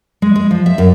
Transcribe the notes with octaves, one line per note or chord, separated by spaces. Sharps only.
G#3
G#3
F3
E5
F#2